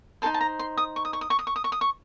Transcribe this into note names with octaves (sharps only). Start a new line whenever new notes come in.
D#4 A4 C5 A5
A5
A#5
C6
D#6
C#6
D#6
C#6
D#6
C#6
D#6
C#6
D#6
C#6
D#6
C#6